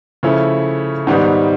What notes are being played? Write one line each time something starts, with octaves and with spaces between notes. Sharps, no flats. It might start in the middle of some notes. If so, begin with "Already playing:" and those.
C#3 F3 A3 C#4 E4
G#2 D#3 G3 B3 D#4